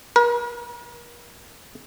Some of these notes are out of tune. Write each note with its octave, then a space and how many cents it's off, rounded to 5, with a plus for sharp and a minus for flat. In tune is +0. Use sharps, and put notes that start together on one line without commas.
A#4 +45